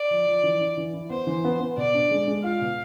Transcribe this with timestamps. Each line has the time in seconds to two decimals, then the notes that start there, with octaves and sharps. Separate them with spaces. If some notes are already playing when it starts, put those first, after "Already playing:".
Already playing: D5
0.11 F3
0.26 F3
0.43 E3
0.61 E4
0.77 E3
0.94 E4
1.10 B3 C5
1.27 E3
1.44 B3
1.60 B3
1.77 B2 D5
1.94 D4
2.11 G#3
2.28 G#3
2.43 F4 F5
2.61 B2